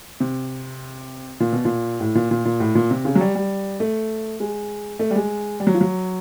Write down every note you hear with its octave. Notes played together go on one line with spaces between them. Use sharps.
C3
A#2
B2
A#2
A2
A#2
A#2
A#2
A2
A#2
C3
C#3
F#3
G3
G3
A3
G#3
A3
G3
G#3
G3
F#3
F3
F#3